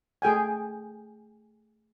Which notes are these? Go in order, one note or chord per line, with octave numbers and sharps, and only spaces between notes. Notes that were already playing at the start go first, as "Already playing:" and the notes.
A3 G#4 G5 G#5